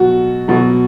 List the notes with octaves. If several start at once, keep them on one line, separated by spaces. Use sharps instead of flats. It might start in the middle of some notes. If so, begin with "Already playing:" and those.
Already playing: B2 F#3 F#4
B2 F#3